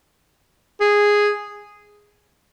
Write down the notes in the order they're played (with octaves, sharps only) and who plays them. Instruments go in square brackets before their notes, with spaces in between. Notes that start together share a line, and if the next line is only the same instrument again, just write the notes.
[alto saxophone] G#4